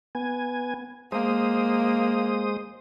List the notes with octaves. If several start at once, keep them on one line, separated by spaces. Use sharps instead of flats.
B3 G#5
G#3 A#3 C5 D#6